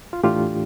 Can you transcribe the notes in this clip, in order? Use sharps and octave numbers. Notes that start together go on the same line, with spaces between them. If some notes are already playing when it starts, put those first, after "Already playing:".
F4
A2 E3 A3 D4 F4 G4